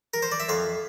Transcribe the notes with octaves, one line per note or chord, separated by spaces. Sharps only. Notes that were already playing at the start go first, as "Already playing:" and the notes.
A#4
C5
D5
E5
F2 F5